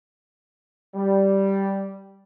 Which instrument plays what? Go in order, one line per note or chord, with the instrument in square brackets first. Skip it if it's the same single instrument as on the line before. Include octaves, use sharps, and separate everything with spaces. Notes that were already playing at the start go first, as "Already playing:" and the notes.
[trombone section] G3